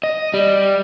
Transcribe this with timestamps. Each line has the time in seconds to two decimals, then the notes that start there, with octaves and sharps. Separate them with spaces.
0.03 D#5
0.34 G3